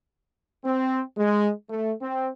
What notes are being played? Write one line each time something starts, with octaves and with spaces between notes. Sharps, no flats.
C4
G#3
A3
C4